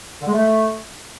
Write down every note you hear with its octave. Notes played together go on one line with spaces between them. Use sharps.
D3
G#3
A3